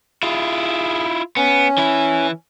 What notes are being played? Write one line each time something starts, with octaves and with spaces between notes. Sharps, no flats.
E4 F4 G#4
B3 C#4
E3 E4